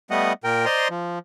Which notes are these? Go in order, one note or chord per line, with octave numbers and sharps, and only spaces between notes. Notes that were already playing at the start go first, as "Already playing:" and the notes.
G3 A3 B3 D#5 F#5
A#2 A#4 G5
C5 D5 D#5 A#5 C6
F3